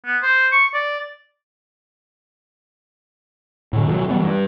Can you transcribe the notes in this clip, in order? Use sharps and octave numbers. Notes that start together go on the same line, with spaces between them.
B3
C5
C#6
D5
A2 D3
B2 D#3 E3 F#3
E3 F#3 G3 B3
G2